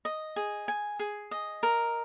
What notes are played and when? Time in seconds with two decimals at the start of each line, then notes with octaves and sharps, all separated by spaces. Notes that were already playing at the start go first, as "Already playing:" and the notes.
0.05 D#5
0.36 G#4
0.68 G#5
0.99 G#4
1.31 D#5
1.63 A#4